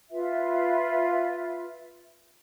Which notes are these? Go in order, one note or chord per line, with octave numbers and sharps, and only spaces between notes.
F4 B4 E5